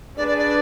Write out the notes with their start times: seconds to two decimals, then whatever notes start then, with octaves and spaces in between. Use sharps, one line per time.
0.17 D4 G#4 B4 D5
0.28 D5
0.38 D5